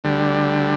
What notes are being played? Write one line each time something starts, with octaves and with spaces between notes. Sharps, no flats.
D2 D3 G3